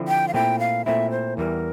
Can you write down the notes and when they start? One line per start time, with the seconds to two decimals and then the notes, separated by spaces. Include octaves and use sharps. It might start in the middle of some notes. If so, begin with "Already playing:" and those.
Already playing: D3 F3 C4 E4
0.08 G5
0.28 F5
0.34 A#2 A3 C4 E4 G5
0.59 F5
0.85 A#2 A3 C4 E4 E5
1.11 C5
1.37 E2 E3 G3 A#4